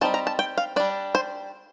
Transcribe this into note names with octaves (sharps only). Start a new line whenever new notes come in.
G3 C4 D#4 A5
A#5
A5
G5
F5
G3 D4 D5
C5